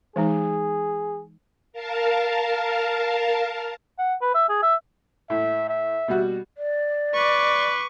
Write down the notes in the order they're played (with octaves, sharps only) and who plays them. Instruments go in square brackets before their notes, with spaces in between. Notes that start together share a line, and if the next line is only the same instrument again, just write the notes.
[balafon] E3 G#3 D#4 [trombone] G#4
[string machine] A#4 F5 A5
[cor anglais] F#5
B4
E5
G#4
E5
[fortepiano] A2 [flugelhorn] E5
[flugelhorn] E5
[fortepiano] B2 G3 F#4
[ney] D5
[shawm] B4 [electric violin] C#6 D6